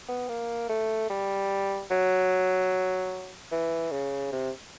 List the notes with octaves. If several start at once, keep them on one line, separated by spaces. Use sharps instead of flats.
B3
A#3
A3
G3
F#3
E3
C#3
C3